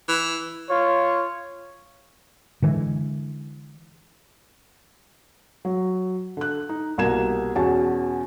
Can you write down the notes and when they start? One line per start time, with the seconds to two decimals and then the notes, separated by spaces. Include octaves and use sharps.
0.08 E3
0.70 F4 C#5
2.62 D3 E3 G3 G#3
5.65 F#3
6.37 D3 F#6
6.69 D#4
6.98 C2 B2 A#3 A#5 G#6 E7
7.56 E2 B2 C#4 F#4 A5